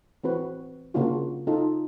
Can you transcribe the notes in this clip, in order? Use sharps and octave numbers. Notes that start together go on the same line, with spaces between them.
E3 C4 F#4 B4
C#3 A#3 D4 F4 F#4
D#4 F4 A4